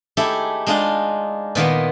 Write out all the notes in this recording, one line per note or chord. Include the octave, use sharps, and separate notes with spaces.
A3 D#4 E4 G4 G#4
G#3 D4 D#4 F4 G#4
A#2 D#3 A#3 B3